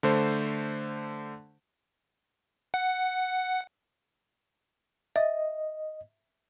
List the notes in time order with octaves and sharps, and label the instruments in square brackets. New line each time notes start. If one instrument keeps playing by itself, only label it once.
[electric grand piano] D3 A3 C5
[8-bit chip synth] F#5
[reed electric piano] D#5 [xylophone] E5